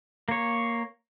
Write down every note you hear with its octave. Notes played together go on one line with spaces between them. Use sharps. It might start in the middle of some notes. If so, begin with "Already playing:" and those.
A#3 C#5